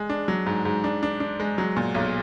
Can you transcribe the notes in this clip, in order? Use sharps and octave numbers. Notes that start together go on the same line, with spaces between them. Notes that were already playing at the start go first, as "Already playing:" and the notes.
Already playing: G#3
D4
F#3
G#2
G#2
D4
D4
D4
G#3
F#3
A#2
B1